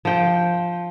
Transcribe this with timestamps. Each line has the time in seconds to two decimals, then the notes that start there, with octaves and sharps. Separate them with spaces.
0.05 F3 G5